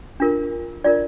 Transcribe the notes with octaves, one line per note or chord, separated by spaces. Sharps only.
D4 F4 A#4
D4 F4 A#4 D5